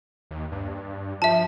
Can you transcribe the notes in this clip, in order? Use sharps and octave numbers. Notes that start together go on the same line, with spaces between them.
D#2
G2
F3 E5 A5